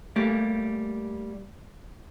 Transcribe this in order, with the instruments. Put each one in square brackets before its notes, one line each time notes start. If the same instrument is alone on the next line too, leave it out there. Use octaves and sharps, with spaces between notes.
[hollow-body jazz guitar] G3 A3 A#3 G4